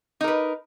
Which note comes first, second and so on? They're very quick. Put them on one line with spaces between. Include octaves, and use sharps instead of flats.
D#4 A#4 B4